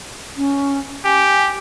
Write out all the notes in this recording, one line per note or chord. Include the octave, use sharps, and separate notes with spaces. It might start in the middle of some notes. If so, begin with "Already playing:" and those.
C#4
G4 G#5